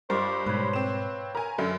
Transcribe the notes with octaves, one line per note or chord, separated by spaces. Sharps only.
G2 F4 A#4 C5 D#5 C#6 D6
G#2 B2 B4 C#5
C4 E7
A#4 G#5 A#5 B5
F#2 D3